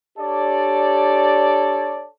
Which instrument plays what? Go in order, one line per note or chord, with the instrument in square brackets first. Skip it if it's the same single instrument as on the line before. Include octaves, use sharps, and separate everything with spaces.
[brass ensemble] D4 G4 A4 C#5 D5